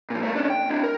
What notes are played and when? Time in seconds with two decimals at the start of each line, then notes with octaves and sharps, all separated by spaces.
0.10 A#2 F3
0.23 A3 A#3
0.35 C#4 D4
0.50 G5
0.70 D4 E4
0.83 A#4